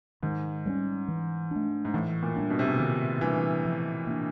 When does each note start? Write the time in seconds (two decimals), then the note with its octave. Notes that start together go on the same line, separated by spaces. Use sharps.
0.23 G#2 D#3
0.66 G3 A#3 C#4
1.08 E3
1.51 A3 D4
1.85 G#2
1.94 A2 E3
2.23 A#2
2.36 G3 B3 D4
2.50 B2
2.59 C3
2.68 B2
2.79 A#2 D#3
3.21 E3 G3 A#3 D4
3.65 F3
4.07 A#3 D4